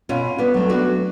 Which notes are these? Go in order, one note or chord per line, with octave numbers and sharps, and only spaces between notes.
B2 C#4 F4
B3 D4
F#3 A3
D4 F#4